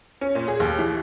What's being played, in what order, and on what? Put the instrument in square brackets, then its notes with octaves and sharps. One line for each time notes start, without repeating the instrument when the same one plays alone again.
[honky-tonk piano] C#4
A#2
G#4
D#2
E3